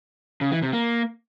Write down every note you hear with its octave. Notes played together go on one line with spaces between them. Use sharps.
C#3
E3
C3
A#3